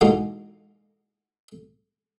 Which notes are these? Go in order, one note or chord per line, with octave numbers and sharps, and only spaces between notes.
E2 B2 G#3 A#3 D#4